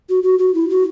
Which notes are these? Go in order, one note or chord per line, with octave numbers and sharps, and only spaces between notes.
F#4
F#4
F#4
E4
F#4